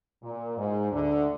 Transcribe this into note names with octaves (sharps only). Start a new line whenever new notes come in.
A#2
G#2
D2 D3